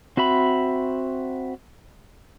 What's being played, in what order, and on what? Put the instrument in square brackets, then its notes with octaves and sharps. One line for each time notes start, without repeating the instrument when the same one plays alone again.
[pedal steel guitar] C4 F#4 E5 B5